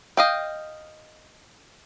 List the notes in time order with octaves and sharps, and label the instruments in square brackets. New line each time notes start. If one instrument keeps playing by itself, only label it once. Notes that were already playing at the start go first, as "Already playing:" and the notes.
[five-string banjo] D#5 F5 G5